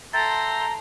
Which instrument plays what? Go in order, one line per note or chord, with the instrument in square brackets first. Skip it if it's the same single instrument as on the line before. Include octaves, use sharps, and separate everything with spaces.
[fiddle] A4 C6 [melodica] E5 G5 [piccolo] A#5 [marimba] A6